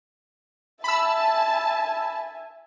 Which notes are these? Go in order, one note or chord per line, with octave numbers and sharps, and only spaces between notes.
E5 G#5 A5 B5 E6